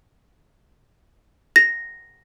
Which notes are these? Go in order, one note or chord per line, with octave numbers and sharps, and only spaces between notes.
A#6